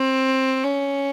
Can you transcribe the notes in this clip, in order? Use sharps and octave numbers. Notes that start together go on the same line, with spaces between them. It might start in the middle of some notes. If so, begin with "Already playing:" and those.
Already playing: C4
C#4